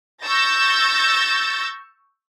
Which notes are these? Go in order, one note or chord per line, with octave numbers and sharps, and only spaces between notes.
C#6 E6 G6 A6 A#6